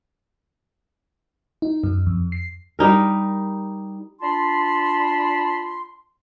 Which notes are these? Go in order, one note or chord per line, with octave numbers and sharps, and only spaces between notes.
D#4
F#2
F2
C7
G3 D#4 A#4
D4 F4 A5 B5 C6